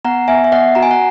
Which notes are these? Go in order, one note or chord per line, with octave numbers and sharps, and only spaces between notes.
B3 F#5 A#5
B3 E5 G#5
E5
B3 D#5 F#5
F#4 A#5
G#5
F#5